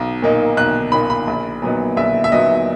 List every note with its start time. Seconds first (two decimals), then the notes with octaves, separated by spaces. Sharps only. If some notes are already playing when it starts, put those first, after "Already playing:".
Already playing: B1
0.22 A#2 A#3 D#4
0.57 B1 F#6
0.92 A#2 A#3 D#4 B5
1.10 B5
1.27 A#1
1.62 A#2 F#3 B3 D#4
1.97 A#1 E5
2.24 E5
2.32 A#2 F#3 B3 D#4 D#5